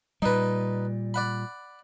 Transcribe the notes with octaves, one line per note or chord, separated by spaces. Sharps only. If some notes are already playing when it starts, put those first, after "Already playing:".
A#2 G3 D#4 B4
D5 F#5 B5